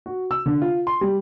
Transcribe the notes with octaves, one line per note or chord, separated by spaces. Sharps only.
F#4
E6
D3
F4
C6
G3